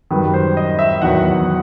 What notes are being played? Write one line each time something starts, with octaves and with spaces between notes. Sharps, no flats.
F#2 D#3 G3 B4
C5
D#5
E5
E2 D#3 F#3 F#5